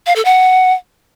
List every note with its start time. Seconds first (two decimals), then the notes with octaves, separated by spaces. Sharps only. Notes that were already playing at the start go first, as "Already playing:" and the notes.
0.06 F5
0.16 A4
0.25 F#5